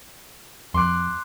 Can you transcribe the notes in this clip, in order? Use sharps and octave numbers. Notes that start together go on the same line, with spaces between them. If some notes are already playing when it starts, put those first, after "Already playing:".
F2 C6 D6 F#6